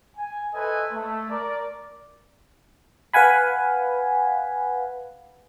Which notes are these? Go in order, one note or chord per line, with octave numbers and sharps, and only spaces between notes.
G#5
A4 B4 C5 D#5 E5 G#5
A3
A#4 D5
B4 F5 F#5 G#5 B5